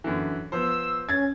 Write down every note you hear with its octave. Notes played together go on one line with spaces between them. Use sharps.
F#2 D3 E3
F3 B3 C5 E6
C#4 G#6 A6